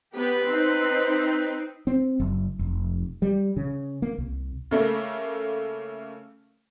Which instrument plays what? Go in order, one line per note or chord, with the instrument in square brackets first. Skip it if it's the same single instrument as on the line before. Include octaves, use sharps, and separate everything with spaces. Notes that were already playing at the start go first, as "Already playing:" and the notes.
[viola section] B3 G4 [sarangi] B4
[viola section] C4 D#4
[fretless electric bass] C4
F#1
F1
G3
C#3
A#3
C2
[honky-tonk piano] C#3 A3 A#3